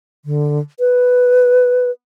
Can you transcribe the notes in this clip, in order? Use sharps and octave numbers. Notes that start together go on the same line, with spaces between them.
D3
B4